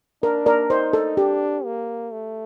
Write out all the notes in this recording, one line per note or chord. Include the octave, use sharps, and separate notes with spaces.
D4 A#4
A#4 D5
D#4 C5
A4
D4 G4
A#3
A3